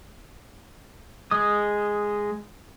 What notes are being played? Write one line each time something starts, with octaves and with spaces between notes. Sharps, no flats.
G#3 D#6